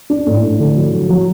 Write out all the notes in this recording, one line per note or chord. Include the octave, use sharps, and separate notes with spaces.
D4
A2
A2
D3
F#3
F#3
F#3